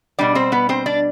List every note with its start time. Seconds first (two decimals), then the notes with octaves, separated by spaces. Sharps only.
0.19 B2 G3 D4 D5
0.35 C4 C5
0.52 B3 B4
0.69 C4 C5
0.86 D4 D5